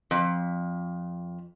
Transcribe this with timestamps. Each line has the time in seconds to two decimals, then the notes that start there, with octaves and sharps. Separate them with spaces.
0.11 F2